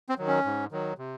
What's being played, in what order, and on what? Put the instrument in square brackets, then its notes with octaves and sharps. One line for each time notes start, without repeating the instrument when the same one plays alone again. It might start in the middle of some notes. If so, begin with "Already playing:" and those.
[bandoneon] C4
D#3 F#3
C#4
G#2
D#3 F#3
C3